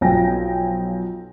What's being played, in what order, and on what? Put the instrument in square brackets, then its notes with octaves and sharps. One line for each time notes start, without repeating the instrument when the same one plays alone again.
[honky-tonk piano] B1 F3 G5 G#5 A#6